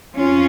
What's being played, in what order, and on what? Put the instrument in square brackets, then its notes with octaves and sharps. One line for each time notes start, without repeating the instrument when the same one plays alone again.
[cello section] F2 C#4 F4